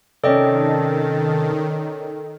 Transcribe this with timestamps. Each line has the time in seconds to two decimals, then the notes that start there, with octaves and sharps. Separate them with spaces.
0.24 C3 D#3 C#4 A4 D5 D#5 G5 A5